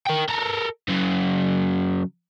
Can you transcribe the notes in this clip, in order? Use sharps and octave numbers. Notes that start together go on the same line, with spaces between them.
A#4 G5
A4 A#4
C#3 F#3